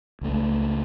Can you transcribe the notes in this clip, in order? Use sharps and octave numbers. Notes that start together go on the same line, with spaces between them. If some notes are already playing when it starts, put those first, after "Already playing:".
C#2 A3